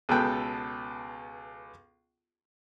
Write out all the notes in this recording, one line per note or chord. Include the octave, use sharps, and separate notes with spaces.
C#2 B2 B3 A4 G5 F#6